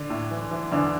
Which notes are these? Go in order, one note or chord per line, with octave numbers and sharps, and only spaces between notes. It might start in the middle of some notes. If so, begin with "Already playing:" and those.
Already playing: D3 D4
A2
E3
E3
E2 D3 D4